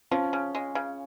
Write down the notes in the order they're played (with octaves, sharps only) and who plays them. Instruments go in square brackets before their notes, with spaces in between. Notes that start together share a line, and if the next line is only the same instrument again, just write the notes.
[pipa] F3 [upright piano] C#4 F4
[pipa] C#3
G#3
C#3